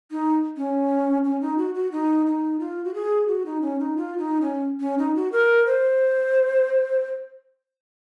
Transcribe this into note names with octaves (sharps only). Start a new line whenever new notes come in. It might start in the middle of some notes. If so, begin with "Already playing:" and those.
D#4
C#4
C#4
D#4
F#4
F#4
D#4
D#4
F4
F#4
G#4
F#4
D#4
C#4
D#4
F4
D#4
C#4
C#4
D#4
F#4
A#4
C5